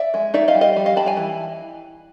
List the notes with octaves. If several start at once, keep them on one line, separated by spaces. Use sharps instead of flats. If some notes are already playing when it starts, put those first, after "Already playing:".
Already playing: D5 E5
G#3
D#4 D5 E5
D#5 F5
G3
D#5 F5
G3
D#5 F5
G3 A5 B5
G#5 A#5
E3